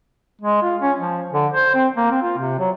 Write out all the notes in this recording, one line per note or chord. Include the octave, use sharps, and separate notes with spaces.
G#3
F4
C#4
F3
D3
C5
C4
A#3
C4
F4
C3
F#3